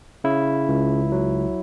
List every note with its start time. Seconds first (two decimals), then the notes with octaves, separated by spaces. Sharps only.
0.24 C#3 E4
0.68 C#2
1.12 F#3